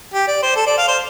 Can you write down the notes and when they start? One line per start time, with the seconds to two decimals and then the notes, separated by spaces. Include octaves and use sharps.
0.14 G4
0.28 D5
0.42 C5
0.56 A4
0.67 D5
0.78 F5
0.88 C5